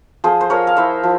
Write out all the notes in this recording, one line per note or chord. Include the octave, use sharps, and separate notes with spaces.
F3 G#4 C5
C5
F3 A#4 C#5
F5
E4 C5 E5
F3